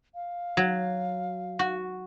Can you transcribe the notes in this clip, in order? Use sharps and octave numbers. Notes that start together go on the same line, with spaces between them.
F5
F#3
F#4